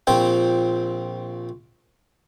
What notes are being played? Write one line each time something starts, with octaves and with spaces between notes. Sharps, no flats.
A#1 F3 C4 G5